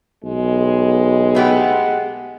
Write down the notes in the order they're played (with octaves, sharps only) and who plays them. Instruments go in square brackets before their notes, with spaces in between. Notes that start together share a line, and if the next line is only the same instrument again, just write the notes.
[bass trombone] B1 [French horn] G#3
[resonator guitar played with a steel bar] A3 B3 G4